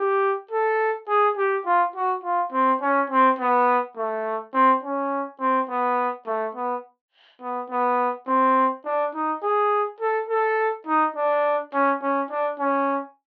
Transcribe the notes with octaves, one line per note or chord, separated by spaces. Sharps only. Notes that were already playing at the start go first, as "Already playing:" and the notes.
Already playing: G4
A4
G#4
G4
F4
F#4
F4
C4
C#4
C4
B3
A3
C4
C#4
C4
B3
A3
B3
B3
B3
C4
D4
D#4
G#4
A4
A4
D#4
D4
C#4
C#4
D4
C#4